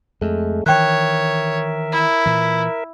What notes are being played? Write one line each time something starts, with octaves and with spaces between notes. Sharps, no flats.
F2 G#3 A3
D#3 E3 A#4 C#5 E5 G5 F#6
E4
A#2 E3